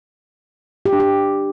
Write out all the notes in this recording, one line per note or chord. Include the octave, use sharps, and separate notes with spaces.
G4
D4
G4